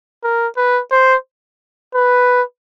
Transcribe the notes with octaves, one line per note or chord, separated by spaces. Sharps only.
A#4
B4
C5
B4